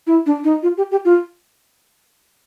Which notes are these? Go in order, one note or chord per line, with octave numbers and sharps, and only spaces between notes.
E4
D4
D#4
F4
G4
G4
F4